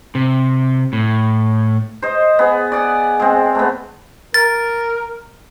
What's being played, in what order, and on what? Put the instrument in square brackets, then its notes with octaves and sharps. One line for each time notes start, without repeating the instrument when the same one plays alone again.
[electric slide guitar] C3
A2
[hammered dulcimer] C5 D#5
B3 G#4
D5 F#5 G#5
G#3 C4
A3 B3
[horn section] A#4 [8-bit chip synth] A6